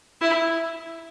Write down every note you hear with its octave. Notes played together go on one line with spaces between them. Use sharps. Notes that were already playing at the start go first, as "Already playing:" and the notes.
E4